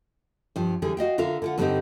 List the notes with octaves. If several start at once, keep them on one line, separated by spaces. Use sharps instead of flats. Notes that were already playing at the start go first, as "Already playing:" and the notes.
G2 F3
D3 E3 G3 G#4
F#4 D#5 F5 G5
D3 F4 A#4 E5 F5
D3 F4 F#5
G2 D3 G3 B3 C4 D#4